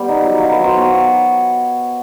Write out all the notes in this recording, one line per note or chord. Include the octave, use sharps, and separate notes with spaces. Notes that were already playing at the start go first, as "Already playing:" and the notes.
Already playing: G3 B3
D#4
F#3
D#4 F5
B4
F#3 C5
B3 C#5